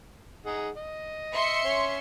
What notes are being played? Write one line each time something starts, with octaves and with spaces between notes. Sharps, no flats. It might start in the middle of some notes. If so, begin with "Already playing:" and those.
D#4 G#4 F#5
D#5
E5 C6 C#7
C#4 C#5